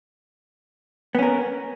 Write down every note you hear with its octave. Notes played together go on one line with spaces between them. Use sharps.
B3 C#4 A#4